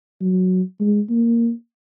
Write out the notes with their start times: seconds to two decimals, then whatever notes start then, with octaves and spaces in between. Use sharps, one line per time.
0.21 F#3
0.80 G#3
1.10 A#3